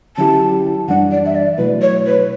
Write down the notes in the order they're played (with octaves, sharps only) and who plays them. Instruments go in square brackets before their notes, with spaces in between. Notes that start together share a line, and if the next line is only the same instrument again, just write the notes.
[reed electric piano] D3 F#3 C#4 E4 G4 [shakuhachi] A5
[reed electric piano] F#2 E3 G3 D4 [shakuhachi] F#5
[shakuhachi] D5
E5
D5
[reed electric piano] B2 F#3 A3 E4 [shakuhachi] B4
[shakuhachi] C#5
B4